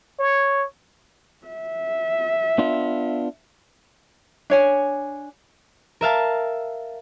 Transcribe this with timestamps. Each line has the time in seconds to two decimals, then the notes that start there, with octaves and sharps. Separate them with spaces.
0.19 C#5
1.47 E5
2.58 B3 D4 F4
4.50 D4 C#5 G#5
6.01 A#4 E5 F5 A5